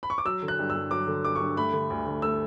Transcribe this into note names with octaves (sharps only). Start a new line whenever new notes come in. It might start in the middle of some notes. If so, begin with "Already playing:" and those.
B5
C#6
D6
F#3 E6
D3
F#6
G2
E6
G2
F#3 D6
D3
G2 D6
C#6
G2
A3 B5
D3
D2
D2
A3 E6